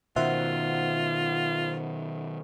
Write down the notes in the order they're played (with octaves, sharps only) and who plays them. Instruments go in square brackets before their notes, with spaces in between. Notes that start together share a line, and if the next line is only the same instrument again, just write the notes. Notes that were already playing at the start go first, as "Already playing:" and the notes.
[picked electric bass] B2 D#3 [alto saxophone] F4 [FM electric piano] C5 E5 F#5